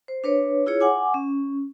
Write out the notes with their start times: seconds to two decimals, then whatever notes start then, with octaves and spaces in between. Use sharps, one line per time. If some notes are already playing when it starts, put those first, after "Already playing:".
0.08 C5
0.24 D4 B4 C#5
0.66 E4 F4 G#4 C#5
0.81 F#5 G#5 D6
1.14 C#4